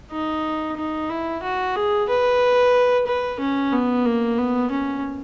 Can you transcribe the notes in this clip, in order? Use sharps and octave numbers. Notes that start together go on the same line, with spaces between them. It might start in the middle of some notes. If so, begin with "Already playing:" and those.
D#4
D#4
E4
F#4
G#4
B4
B4
C#4
B3
A#3
B3
C#4